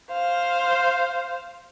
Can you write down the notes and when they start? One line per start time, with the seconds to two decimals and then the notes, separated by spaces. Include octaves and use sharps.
0.12 C5 F5